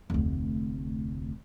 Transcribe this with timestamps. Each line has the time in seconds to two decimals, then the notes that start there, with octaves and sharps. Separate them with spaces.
0.10 F1 D2